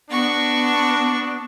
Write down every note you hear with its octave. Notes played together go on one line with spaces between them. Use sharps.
B3 D4 F#4 C#6